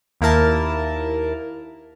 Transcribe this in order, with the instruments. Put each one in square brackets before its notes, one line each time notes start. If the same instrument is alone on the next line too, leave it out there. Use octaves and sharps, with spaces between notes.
[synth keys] D#2 A#3 E4 A#4 A5